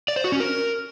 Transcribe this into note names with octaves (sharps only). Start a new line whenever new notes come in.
D5
C5
F#4
C#4
A#4